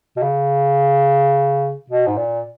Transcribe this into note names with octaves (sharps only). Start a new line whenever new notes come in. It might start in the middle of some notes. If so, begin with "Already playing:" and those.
B2
C#3
B2
G#2
A#2